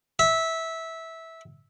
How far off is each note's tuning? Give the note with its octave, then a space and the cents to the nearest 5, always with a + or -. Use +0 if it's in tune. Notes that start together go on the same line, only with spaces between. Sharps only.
E5 -15